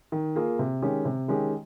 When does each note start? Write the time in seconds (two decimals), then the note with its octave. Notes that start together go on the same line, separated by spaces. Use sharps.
0.12 D#3
0.36 A#3 F4 G#4
0.59 C3
0.82 D#3 G#3 C#4 G4
1.05 C3
1.28 D#3 G#3 C#4 G4